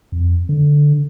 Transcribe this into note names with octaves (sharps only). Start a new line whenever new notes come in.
F2
D3